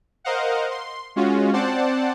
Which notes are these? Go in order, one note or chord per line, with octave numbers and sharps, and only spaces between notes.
A#4 C5 D#5 F5 F#5
C6
G#3 C#4 F4 F#4
C4 C5 D5 F#5 A5